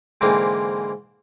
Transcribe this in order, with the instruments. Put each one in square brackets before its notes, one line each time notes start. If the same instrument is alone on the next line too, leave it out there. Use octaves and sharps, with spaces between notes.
[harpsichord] G#2 D3 E3 A#3 C4